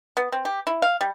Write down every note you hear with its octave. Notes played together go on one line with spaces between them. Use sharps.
B3
C4
G4
E4
F5
G3